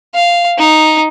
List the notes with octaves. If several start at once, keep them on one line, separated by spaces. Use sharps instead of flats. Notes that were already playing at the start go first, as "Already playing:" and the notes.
F5
D#4